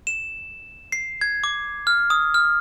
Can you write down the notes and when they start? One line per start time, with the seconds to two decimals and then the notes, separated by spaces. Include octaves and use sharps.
0.07 E7
0.92 C7
1.21 G#6
1.44 D6
1.87 F6
2.10 D#6
2.34 F6